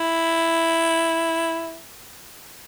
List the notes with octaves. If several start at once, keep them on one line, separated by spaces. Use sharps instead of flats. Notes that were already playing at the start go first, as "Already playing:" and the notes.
Already playing: E4